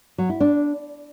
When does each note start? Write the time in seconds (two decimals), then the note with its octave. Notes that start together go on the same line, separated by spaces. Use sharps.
0.18 F#3
0.29 E4
0.40 D4